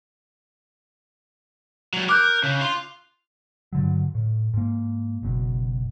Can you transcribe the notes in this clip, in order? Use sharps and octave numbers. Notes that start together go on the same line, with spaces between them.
F#3 G3
A#4 D6 F#6 G6
C#3
F5 C6
G2 D3 F#3
A2
G#2 A#3
F#1 B2